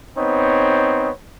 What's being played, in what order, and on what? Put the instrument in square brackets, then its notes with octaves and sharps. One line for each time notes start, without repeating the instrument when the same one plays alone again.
[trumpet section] B3 C4 D#4 C#5